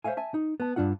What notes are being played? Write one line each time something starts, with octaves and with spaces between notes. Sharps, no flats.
C5 C#5 E5 F5 G#5
E5 G#5 A5
D#4
B3 A5
G2 C#3 D4 F4 F#5